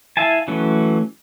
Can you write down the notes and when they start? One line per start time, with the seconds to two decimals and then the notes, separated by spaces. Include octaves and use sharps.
0.17 E4 E5 F5 G#5 A5
0.48 E3 F#3 A3 C#4